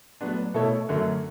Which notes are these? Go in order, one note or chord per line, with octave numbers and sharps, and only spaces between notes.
A2 F#3 B3 D4
B2 A3 E4 A4 C#5
F#2 D3 F#3 A3